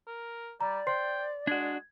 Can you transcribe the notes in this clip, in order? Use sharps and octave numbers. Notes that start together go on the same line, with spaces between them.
A#4
G3 D5 A#5
C5 G5 C6 C7
G#3 D4 F#4 G#6